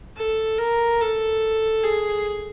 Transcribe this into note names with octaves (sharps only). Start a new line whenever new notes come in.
A4
A#4
A4
G#4